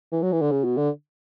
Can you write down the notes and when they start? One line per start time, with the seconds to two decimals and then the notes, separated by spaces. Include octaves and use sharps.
0.12 E3
0.23 F#3
0.33 E3
0.42 D3
0.52 C#3
0.65 B2
0.78 D3